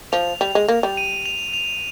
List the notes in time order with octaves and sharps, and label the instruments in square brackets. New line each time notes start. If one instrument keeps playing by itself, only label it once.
[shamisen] F3 [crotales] F7
[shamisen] G3 [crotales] F7
[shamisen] G#3
A#3
G3
[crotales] D#7
F7
F7